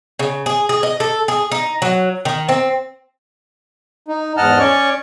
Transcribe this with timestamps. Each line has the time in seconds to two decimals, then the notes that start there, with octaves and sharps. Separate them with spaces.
0.19 C#3
0.46 G#4
0.69 G#4
0.83 D#5
1.00 A4
1.28 G#4
1.52 D#4
1.82 F#3
2.25 D#3
2.49 C4
4.08 D#4
4.37 E2 G#2 D#5 F#5 A5 F6
4.59 C#4 C#5 D5 C#6